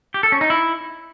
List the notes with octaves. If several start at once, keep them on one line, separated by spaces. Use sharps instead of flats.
G4
A4
C#4
D#4
E4